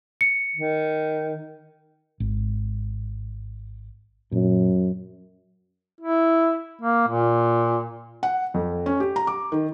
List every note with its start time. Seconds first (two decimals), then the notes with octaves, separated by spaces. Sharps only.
0.21 C#7
0.56 D#3
2.20 G#1
4.32 F#2 A#2
6.00 E4
6.81 A#3
7.08 A#2
8.23 F#5
8.54 F2
8.86 C#4
9.00 G4
9.16 A#5
9.27 D6
9.52 D#3